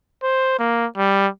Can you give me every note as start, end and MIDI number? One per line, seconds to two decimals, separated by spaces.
0.23 0.55 72
0.59 0.86 58
0.97 1.28 55